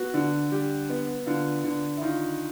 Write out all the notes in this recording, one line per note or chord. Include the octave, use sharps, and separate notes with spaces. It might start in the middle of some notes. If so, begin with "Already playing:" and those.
Already playing: B3 F#4
D3
G3 G4
B3
D3 F4
D3
E4
D#3 F4